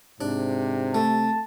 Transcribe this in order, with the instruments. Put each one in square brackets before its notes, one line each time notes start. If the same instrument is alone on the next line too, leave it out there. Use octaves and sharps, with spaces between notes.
[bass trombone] G#2 [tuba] C3 [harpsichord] D4
[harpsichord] A3 [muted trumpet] A5